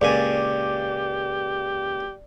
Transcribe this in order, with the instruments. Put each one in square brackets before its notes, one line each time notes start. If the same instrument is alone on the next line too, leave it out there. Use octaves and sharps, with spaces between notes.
[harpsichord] C#2 A#2 G#5 [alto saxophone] G4 [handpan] D5